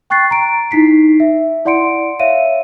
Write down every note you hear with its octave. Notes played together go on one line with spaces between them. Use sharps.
G5 C#6 F#6 A6 C7
A#5 D7
D#4 E4 B6 C7
E5
E4 D5 F#5 C6 C#7 D7
C#5 E5 F5 D#7